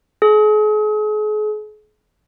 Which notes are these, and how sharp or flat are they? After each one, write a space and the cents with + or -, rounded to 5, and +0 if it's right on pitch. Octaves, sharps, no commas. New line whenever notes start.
G#4 +40